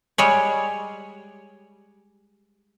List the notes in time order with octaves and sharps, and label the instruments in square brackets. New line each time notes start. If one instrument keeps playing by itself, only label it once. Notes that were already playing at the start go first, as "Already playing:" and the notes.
[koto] G3 G#3 C#5